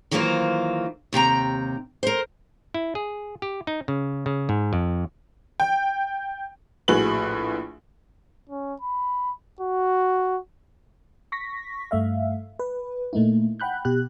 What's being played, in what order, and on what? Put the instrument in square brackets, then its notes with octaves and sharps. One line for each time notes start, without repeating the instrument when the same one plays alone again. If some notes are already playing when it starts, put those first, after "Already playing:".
[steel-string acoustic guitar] D#3 E3 F#3 A#3 F4 C5
D#2 C3 G5 A#5
A#4 C5
[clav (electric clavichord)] E4
G#4
G4
D#4
C#3
C#3
G#2
F2
[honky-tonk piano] G5
A#1 A2 F#4 G#4 B4 F#7
[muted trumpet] C#4
B5
F#4
[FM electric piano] C#6 A#6 B6
G2 A3 E5 F5
B4
A#2 A3 A#3 D#4 E4
F#5 G5 B5 F#6 G6
B2 G4 F#6